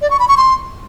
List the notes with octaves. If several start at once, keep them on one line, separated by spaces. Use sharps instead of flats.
D5
C#6
B5
C#6
C6